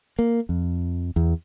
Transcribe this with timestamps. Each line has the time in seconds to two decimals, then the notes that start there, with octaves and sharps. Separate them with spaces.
0.19 A#3
0.49 F2
1.16 E2